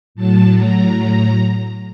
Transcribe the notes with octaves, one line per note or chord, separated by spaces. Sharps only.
A2 F#3 A5
A#5